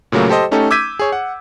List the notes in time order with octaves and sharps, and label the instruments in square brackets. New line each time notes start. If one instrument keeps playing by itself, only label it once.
[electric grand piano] A#2 C#3 F#3 A3 A#3
G4 A4 C5 D#5
A3 C#4 D#4 G4 A4
D6 E6 G6 G#6 B6 D#7
G#4 C#5
F#5